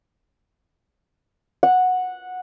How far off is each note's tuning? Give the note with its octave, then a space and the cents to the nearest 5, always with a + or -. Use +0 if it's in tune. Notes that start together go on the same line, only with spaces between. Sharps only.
F#5 -10